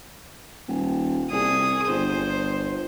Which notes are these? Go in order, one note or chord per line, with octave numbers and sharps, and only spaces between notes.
D#1
C2 G#4 D#6
G1 C5